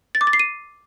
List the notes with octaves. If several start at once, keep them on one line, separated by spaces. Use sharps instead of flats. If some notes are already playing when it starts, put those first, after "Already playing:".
A6
D6
A6
C7
D#7